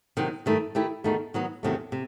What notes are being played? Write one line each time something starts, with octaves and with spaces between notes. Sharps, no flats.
C3 D#3 F#3
G2 D#3 A3 E4
D#3 A3 E4 G4
E2 D#3 A3 D#4 F#4
D#3 F#3 B3
E2 C3 D#3 F#3 A3
C3